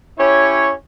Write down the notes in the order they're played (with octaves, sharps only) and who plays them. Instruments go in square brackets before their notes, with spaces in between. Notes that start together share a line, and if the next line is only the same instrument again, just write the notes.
[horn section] C#4 E4 G4 C#5